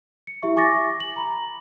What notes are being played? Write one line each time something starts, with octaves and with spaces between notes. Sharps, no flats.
C#7
E4 G4 E5 C#6
G#5 C#6 D6 A6 A#6
F#7
A#5 B5